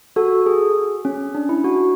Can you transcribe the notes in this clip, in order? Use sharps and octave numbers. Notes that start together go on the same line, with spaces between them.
F#4 A4
G#4
C#4
D4
E4
F#4